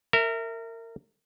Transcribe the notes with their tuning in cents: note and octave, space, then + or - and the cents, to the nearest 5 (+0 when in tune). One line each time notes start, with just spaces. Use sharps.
A#4 -25 E5 +0